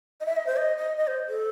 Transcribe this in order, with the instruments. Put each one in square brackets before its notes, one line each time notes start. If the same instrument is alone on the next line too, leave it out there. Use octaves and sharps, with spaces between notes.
[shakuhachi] D#5
E5
D#5
C5
D#5
D#5
D#5
C5
A4